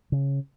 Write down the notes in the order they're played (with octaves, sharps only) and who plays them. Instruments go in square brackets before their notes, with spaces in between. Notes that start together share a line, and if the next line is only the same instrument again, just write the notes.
[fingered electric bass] C#3